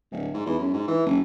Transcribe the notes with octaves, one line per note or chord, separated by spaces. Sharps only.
D1
G#2
E2
F#2
G#2
E3
F#1